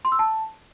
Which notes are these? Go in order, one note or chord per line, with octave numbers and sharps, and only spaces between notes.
C6
E6
A5